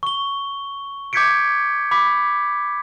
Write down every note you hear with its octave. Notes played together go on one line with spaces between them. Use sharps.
C#6 G7
D6 G6 G#6 B6 C#7 D7
B5 D6 B6